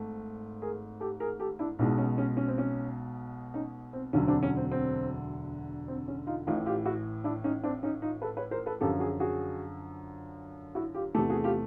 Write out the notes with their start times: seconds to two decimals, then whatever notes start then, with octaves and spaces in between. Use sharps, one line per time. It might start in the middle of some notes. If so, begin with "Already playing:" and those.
Already playing: G#1 G#2 A3
0.62 G#4 A#4
1.00 G4 A4
1.20 G#4 A#4
1.40 G4 A4
1.59 D4 E4
1.79 B1 B2 G#3 D4 E4
1.98 C#4
2.18 C#4
2.37 C#4
2.48 C4
2.58 C#4
3.54 C#4 D#4
3.93 C4
4.13 E1 D2 D3 F#3 C#4
4.28 C4 D4
4.43 C#4
4.57 C4
4.71 C4
5.88 C4
6.08 C#4
6.27 D#4 F4
6.47 A1 A2 E3 D#4 F4
6.66 F4 G4
6.85 E4 F#4
7.24 D4 E4
7.44 C#4 D#4
7.63 C4 D4
7.83 C#4 D#4
8.02 D#4 F4
8.22 A4 B4
8.37 B4 C#5
8.51 A#4 C5
8.66 A4 B4
8.80 F#2 D3 F3 G4 A4
9.00 F#4 G#4
9.20 F#4 G#4
10.75 E4 F#4
10.95 F4 G4
11.14 E2 C3 E3 A3 G4 A4
11.29 F#4 G#4
11.44 F4 G4